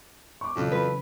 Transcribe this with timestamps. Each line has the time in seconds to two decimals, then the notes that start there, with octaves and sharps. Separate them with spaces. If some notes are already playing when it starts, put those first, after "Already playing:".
0.41 C#6 D6
0.56 F2 C#3 E3 F#3
0.71 B4